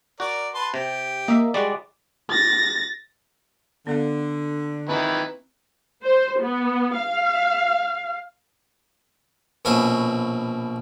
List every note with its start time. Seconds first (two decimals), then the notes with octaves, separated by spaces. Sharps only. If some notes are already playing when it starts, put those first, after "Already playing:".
0.20 F#4 A#4 D5
0.54 B4 A5 C6
0.74 C3 G4
1.28 A#3 D#5 E5
1.54 G3 G#3 F#4 D5
2.30 A6 A#6
3.87 D3 B3 A4 F5
4.89 D#3 C4 E4 B4
6.03 C5
6.39 B3
6.97 F5
9.65 A#1 B2 C#4 E5 F5 D#6